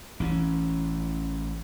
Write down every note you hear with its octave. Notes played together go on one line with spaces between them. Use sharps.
A1 E3 C4 C#4